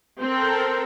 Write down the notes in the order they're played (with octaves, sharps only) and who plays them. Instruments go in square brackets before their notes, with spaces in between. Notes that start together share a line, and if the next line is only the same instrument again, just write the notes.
[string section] C4 [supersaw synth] A4 A#4